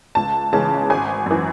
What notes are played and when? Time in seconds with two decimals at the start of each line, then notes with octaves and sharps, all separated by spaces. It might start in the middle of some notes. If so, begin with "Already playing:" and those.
0.15 C#2 A5
0.53 C#3 E3 G#3 C#4 A5
0.90 G#1 G#5
1.26 F#2 E3